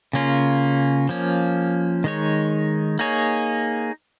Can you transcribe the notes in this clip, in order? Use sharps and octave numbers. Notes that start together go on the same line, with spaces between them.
C#3 A#3 C#4 F4
F3 A#3 C#4
D#3 G#3 D#4 C#5
A#3 D#4 G#4 C#5